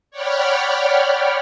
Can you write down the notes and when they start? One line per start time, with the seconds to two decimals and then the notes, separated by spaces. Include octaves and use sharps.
0.11 C#5 D5 F#5 G5 B5 F6